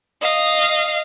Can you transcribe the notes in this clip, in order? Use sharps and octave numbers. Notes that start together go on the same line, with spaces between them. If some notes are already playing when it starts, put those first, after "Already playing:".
D#5 F5